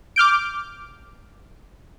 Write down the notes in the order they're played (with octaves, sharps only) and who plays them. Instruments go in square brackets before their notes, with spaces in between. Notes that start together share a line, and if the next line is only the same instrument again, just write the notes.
[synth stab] D6 F6 G6 D7